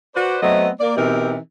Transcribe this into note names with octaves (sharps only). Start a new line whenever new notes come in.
F#4 B4 C5 D5
F#3 A3 B3 C4 D#5
A#3 D5
B2 E3 C4 D#4 G4 A#4